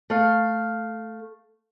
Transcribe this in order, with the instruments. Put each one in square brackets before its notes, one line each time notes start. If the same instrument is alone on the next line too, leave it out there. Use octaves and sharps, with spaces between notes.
[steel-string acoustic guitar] A3 F5